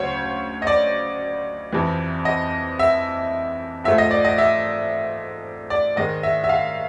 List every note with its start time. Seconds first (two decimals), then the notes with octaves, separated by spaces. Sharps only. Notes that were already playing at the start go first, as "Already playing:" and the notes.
Already playing: D2 C#3 F#3 C5 C#5
0.62 D#5
0.67 D5
1.72 F2 C3 E3
2.25 D#5
2.79 E5
3.84 G#2 F3 A3 E5
3.98 D#5
4.11 D5
4.25 D#5
4.38 E5
5.70 D5
5.96 G#2 D#3 G#3 D#5
6.23 E5
6.44 E5
6.49 F5